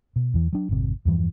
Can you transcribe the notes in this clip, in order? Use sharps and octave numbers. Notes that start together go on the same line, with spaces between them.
B2
E2 E3
F#3 D4
G#1 F2 C3
E2 G2 E3 F3